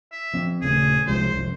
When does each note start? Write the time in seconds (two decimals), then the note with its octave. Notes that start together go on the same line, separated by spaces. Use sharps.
0.12 E5
0.33 F3 C4
0.62 D#1 C#3 A3 G#4
1.07 C2 F3 G#3 C5
1.33 C2 F2